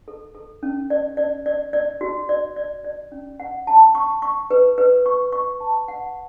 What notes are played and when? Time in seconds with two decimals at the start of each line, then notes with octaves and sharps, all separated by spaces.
0.08 A4
0.35 A4
0.63 C#4
0.90 D5
1.17 D5
1.46 D5
1.73 D5
2.01 F#4
2.29 D5
2.56 D5
2.84 D5
3.12 C#4
3.40 F#5
3.67 A5
3.95 C#6
4.22 C#6
4.51 B4
4.78 B4
5.06 C#6
5.33 C#6
5.60 A5
5.88 F#5